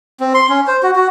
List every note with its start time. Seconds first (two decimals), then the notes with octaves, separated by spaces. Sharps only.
0.20 C4
0.34 C6
0.49 C#4
0.67 C5
0.83 F#4
0.96 F#4